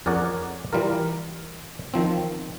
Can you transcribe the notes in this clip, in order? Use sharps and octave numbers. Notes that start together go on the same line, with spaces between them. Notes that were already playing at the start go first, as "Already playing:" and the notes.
F2 C#4 G#4 A#4 D5 F#5
E3 G3 F4 A#4
D#3 F3 C4